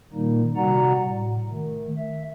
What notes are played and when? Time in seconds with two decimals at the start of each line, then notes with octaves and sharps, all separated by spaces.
0.13 A#2 D#3 G3 A#3 D#4
0.56 C3 G3 F#4 D5 F#5 A#5
1.03 A2
1.51 D#3 A3
1.98 E5